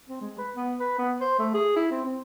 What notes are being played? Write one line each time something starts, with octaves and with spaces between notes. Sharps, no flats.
C4
G#3
B4
B3
B4
B3
C5
A3
G#4
E4
C4
C4